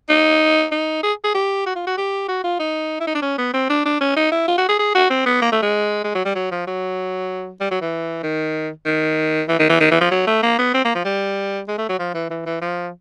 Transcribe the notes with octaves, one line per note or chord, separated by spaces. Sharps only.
D#4
D#4
G#4
G#4
G4
F#4
F4
F#4
G4
F#4
F4
D#4
E4
D#4
D4
C#4
B3
C4
D4
D4
C#4
D#4
E4
F4
F#4
G#4
G#4
F#4
C4
B3
A#3
A3
G#3
G#3
F#3
G3
F#3
F3
F#3
G3
F#3
E3
D#3
D#3
E3
D#3
E3
D#3
E3
F3
F#3
A3
A#3
B3
C4
A#3
F3
G3
G#3
A3
F#3
F3
E3
E3
E3
F3